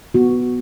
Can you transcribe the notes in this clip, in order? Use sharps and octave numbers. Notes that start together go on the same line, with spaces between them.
B3 F#4